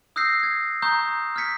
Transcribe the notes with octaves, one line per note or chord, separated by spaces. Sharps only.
D#6 E6 F#6 G6 A#6 C7
G#6
A#5 C#6 D#6 G6
F6 G6 G#6 B6 C#7